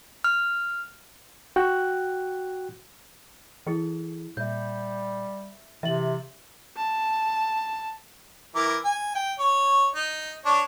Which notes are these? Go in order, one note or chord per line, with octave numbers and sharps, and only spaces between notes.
F6
F#4 G5 F#6
E3 E4 G#4 A4
A#2 G3 E5 G6
C3 E3 E5 A6 F#7
A5
E3 A#4 D6
G#5
G5
C#5
D#4
D4 C#5